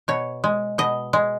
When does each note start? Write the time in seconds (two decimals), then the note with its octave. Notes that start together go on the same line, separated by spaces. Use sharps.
0.08 B2 C#5
0.44 G#3
0.78 B2 D#5
1.13 G#3